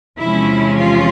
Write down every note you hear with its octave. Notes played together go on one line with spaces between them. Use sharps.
E2 C3 F3 G#3 C#4 E4
F4